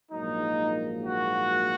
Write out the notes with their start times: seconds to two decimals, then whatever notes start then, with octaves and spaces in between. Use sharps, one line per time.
0.12 A#1 G#2 F#3 A#3 D#4
1.05 F#4